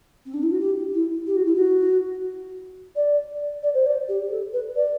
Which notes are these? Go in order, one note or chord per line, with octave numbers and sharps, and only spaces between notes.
C4
D4
E4
F#4
G4
E4
G4
F#4
E4
F#4
D5
D5
C5
D5
G4
A4
B4
D5